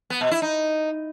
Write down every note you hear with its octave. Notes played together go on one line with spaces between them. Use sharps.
B3
B2
E4
D#4